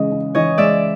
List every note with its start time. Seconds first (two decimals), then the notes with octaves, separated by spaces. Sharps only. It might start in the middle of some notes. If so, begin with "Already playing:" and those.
Already playing: C#3 E3 G#3 D#5
0.12 C#3
0.35 E3 C#5 D#5
0.58 G#3 D5 E5